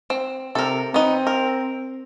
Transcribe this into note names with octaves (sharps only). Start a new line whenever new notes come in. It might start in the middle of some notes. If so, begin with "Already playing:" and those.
C4
C3 A4 A#4
B3 C4 D#4
A#4